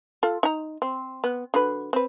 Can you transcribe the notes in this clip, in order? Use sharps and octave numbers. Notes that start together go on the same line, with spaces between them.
F4 A4
D#4 A#5
C4
B3
D3 F#3 B4
C4 B4